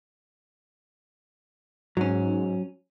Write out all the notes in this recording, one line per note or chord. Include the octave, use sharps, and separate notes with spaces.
G#2 F#3 C#4